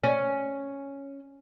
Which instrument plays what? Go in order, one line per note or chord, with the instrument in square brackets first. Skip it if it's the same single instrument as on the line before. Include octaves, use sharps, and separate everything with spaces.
[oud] C#4